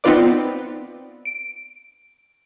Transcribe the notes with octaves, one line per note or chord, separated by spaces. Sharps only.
B3 C4 D#4 F4 B4 D5
D7